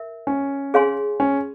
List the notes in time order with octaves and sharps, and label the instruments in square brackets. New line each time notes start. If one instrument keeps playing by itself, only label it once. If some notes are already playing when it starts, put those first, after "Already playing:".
Already playing: [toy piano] A#4 E5
[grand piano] C#4
[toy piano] G#4 C#5 F5 G#5 C6
[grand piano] C#4